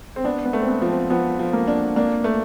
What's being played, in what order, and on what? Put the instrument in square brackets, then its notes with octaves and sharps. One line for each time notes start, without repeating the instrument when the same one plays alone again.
[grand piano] C4
[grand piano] B3 [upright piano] D4
[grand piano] B3
[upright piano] A3
[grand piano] C4
B3
[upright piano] F3
[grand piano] C4
[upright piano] F3 [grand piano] B3
[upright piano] F3
[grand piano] A#3
[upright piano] D4
[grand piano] A#3 [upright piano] D4
[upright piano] A3